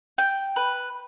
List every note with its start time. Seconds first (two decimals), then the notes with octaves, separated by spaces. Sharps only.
0.18 G5
0.56 B4